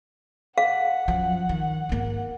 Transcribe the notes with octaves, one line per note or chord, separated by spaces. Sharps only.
F5 F#5
F#2 F3
D#3
G#2 A#3